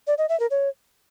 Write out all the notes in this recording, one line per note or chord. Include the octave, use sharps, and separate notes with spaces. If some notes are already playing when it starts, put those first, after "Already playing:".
D5
D#5
E5
A#4
C#5